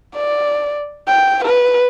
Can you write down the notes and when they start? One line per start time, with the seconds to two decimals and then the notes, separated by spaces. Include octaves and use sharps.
0.15 D5
1.08 G5
1.45 B4